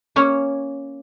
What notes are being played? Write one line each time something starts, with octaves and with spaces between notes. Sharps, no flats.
A#3 C#4 C#5